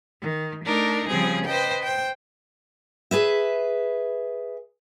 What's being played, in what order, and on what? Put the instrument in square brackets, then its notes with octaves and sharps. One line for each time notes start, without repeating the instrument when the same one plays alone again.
[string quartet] D#3
A3 D4 D#4 A#4
C#3 F3 G3 C4 G#4
B4 C5 D#5 G5
C5 G5
[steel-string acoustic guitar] G#4 B4 E5